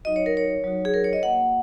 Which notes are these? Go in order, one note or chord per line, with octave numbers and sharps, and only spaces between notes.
F#3 D#4 F#4 D#5
C#5
A#4
C#5
F#3 D#4 F#4
G#4
A#4
C#5
D#5
A#3 F#4 F#5